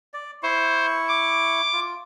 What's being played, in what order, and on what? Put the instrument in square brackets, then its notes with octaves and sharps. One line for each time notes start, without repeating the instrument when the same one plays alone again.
[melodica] D5
[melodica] E4 C#6 [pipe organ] C5
[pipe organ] D6
[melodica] F4